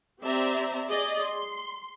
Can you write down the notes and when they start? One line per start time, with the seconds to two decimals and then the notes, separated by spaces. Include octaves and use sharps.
0.21 C4 G4 C5 D5 E5 A#5
0.87 G#4 D5 D#5
1.22 C6